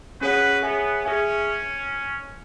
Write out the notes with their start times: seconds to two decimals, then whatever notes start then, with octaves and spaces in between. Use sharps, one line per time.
0.20 C#4 F#4 G#4 B4 C#5 F#5
0.62 B3 G#4 C#5 E5 G#5
1.04 C#4 G#4 E5 G#5